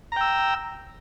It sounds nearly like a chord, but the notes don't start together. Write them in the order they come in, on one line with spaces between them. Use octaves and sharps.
A#5 G5 E6